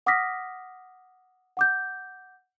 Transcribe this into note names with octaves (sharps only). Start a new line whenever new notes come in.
F#5 D6 D#6 F6 A#6 B6
F#5 D6 G6